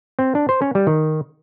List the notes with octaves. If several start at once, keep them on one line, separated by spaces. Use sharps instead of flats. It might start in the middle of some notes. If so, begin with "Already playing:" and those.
C4
D4
C5
C#4
G3
D#3